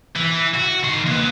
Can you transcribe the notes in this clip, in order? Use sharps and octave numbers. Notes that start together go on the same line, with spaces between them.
E3
F#4
D#3 C6
A#3 B4